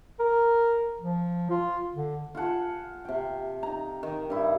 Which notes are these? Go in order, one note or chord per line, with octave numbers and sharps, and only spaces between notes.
A#4
F3
F4
D3
F4 G#4 F#5 A5
C3 G5
D#4 A#5
D#3
G2 E4